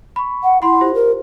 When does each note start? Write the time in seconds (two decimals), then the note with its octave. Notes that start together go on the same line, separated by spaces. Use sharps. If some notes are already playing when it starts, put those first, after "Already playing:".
0.16 B5 C#6
0.43 F#5
0.62 E4 F#5 B5 C6
0.81 F4 G4 C5
0.94 A#4